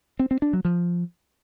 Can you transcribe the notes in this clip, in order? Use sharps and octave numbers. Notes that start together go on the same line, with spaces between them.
C4
C4
D4
F#3
F3